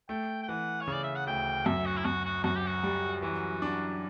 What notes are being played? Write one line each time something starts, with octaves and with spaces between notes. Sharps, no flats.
A3 G5
G5
E3 F#5
C#5
C#3
D5
E5
F#5
D2 G5
F#2 E5
F#4
E4
F#2 F#4
F#4
F#2 F#4
G4
F#4
G3
E3 F#4
D4